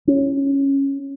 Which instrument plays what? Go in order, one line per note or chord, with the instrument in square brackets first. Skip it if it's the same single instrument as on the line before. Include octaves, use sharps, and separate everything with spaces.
[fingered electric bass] C#4